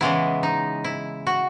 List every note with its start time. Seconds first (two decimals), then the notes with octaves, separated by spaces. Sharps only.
0.01 C#3 E3 G#3 B3 E4
0.43 D#4
0.84 E4
1.27 F#4